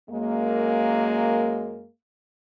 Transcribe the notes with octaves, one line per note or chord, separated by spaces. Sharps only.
F#2 G#3 A#3